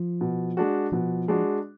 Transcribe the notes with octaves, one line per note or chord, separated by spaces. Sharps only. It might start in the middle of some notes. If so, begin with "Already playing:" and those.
Already playing: F3
B2
G#3 D4 F#4
B2 F3
G#3 D4 F#4